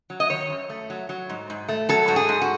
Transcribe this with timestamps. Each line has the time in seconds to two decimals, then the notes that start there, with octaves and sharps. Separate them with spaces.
0.10 F#3
0.20 D#5
0.30 D#3 C#5
0.50 F#2
0.70 A3
0.90 F#3
1.09 F#3
1.30 G#2
1.50 G#2
1.69 A3
1.89 F#3 A4
2.08 G#2 F#4
2.16 G#4
2.29 G#2
2.42 F#4